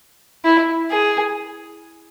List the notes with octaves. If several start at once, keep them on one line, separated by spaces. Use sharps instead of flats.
E4
G#4